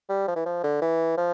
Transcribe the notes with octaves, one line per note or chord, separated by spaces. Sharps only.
G3
F3
E3
F3
D3
E3
F3